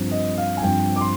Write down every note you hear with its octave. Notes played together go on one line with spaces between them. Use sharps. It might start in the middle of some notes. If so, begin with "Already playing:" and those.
Already playing: G2 F3 C4
D#5
F5
G#5
G2 F3 C4 G5
D6
C6